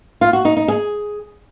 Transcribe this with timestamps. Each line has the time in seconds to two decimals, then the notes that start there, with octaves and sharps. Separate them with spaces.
0.21 F4
0.33 F#4
0.45 D#4
0.57 D#4
0.68 G#4